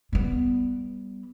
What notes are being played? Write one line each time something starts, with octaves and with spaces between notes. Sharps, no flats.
G3 B3